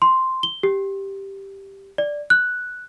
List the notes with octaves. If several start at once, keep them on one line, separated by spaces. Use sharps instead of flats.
C6
G7
G4
D5
F#6